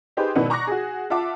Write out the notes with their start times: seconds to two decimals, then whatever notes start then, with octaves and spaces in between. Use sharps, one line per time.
0.17 D#4 G4 G#4 B4 C5
0.35 G#1 B2 D#3 B3 E4 F#5
0.50 A#5 C#6 D6 F#6 A#6
0.67 F#4 G#4
1.10 F4 E5 F#5 A5 D6